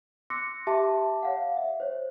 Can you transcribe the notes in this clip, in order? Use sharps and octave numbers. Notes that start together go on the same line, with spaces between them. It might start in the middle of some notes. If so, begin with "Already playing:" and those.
C6 D6 E6 F#6 A#6 C#7
G4 E5 A5 C6 D6
C#5 F5 F#5
E5
C5 C#5